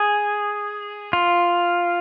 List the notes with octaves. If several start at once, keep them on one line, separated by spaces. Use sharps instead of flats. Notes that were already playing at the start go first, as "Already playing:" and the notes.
Already playing: G#4
F4